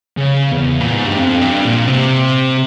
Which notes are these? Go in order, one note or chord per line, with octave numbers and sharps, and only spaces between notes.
C#3
E2
A#2
G#2
G2
F2
G2
A#2
C3